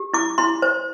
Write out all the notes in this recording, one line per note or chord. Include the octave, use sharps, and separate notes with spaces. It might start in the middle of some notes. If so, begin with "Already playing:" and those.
Already playing: G4
E4 D6
E4 C6
C5